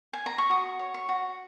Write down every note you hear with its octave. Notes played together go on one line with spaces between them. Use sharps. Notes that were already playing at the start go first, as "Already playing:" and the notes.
G#5
A#5
C#6
F#4 D#6
C#5
C#6
F#4